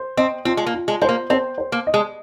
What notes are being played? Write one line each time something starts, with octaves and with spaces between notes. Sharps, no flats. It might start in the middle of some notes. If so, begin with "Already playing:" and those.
Already playing: C5
C4 D#5
C4 F4
G#3
A#3
F4
G#3
G#3 C5
A#3
C4 C5
C5
A#3
D#5
G#3